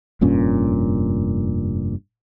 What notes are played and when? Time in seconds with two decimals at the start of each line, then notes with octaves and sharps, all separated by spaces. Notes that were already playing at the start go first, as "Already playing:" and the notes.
0.21 F1 G2 A#2 C#4